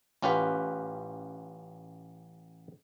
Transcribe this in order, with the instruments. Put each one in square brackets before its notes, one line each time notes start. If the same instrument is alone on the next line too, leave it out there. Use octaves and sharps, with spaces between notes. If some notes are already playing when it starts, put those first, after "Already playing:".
[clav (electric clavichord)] A1 C#4 F4 G4 B4 F#5